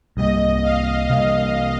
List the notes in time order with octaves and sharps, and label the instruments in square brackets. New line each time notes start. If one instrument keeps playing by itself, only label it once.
[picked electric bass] C2 C3 G3 A#3 [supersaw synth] D#5
[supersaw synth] F5
[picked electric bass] C2 C3 G3 A#3 [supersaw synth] F5